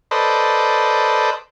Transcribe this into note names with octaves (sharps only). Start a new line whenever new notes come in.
A4 B4 C5 D5 D#5